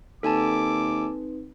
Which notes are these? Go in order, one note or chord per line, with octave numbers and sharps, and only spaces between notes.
D#2 C4 D#4 A4 B4 G#5 A5 D6